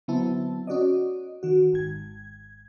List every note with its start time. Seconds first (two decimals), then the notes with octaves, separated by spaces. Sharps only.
0.08 D3 F#3 B3 C4 E4 A5
0.67 C#4 F#4 D5 D#5
1.43 D#3 F#4
1.73 G#1 G#6